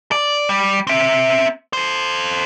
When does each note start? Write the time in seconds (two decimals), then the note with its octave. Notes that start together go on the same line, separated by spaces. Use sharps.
0.12 D5
0.49 G3
0.87 C4 E5
1.73 A4 C5